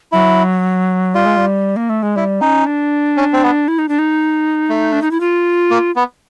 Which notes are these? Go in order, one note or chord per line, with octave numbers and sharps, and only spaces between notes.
F#3 E4
G3 F4
G#3
G3
A#3
A3
G#3
G3 E4
C#4 D#4
D4
C#4
C4
B3
E4
D#4
D4
D#4
A3
D4
D#4
E4
F4
A#3
B3